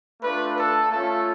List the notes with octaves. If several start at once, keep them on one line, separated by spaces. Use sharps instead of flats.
A3 D4 F4 B4
A4
A3 C#4 F4 A4